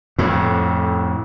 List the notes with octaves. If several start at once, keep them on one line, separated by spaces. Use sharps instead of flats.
F2 A2